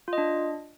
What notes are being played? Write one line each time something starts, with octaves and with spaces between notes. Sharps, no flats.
F4
D#5
D4